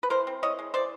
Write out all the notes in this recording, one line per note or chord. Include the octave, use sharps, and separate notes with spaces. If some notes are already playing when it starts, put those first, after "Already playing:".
B4
E3 A#4 C5
C4
E4 C#5 D#5
G#3
E3 C5 D5